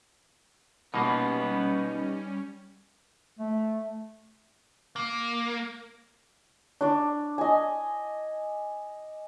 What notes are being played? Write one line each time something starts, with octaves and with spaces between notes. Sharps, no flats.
B2 G3 A#3 B3 C#4 D#4 B4
A3
A#3
D4 D5
D#5 G#5